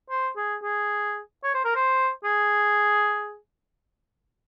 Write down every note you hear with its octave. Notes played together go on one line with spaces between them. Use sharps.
C5
G#4
G#4
C#5
C5
A#4
C5
G#4